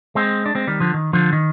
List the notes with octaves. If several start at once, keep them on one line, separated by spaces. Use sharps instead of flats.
G#3 C4
D4
G#3 C4
D#3 G3
D3 F3
D#3
D3 F3
D#3